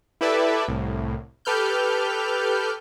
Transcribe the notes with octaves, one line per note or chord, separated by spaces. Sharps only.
E4 G4 A4 B4 D5 E5
C2 A2
G4 A4 B4 F6 G6